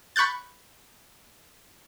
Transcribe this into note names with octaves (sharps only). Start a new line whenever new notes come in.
B5 C#6 F#6 G6 A6